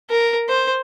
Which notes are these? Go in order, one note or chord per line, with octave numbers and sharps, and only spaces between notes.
A#4
C5